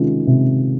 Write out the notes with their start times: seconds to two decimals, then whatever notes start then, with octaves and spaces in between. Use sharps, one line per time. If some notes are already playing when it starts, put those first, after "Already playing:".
Already playing: C3 D#3 G#3 C#4 F4
0.27 C3